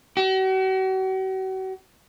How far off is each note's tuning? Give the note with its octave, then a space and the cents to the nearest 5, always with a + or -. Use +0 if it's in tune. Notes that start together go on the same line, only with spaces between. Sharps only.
F#4 +40